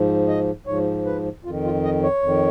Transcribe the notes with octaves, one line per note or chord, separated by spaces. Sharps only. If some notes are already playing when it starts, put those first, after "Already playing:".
Already playing: G#2 F3
D#5
G#2 F3 C#5
B4
F2 D#3 F4
F4
D#5
C#5
F2 D#3